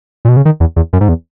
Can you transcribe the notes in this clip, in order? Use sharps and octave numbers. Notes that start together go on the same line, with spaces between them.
A#2
B2
C#3
D#3
E2
E2
F#2
G#2
E2